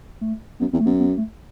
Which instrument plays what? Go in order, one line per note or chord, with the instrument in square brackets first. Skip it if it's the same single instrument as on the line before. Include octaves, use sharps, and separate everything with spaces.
[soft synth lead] A3
[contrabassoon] F#2 [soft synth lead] B3
[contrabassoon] E2 [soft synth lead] C4
[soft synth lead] A3
[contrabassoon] F#2 [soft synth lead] B3
[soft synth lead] B3
A3